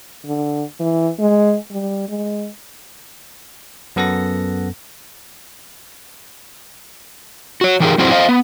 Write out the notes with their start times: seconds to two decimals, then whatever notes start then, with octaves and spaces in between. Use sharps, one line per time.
0.25 D3
0.80 E3
1.19 G#3
1.71 G3
2.09 G#3
3.96 F#2 B3 A4 F#5 A#6
7.61 F#4 C#5
7.80 E3 D#4 G4 G#4 A#4
7.98 F#3 C4 E4 F#4 G#4 C5
8.11 C5 D#5 F5
8.29 B3